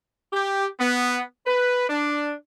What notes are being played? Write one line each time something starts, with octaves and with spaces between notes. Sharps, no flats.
G4
B3
B4
D4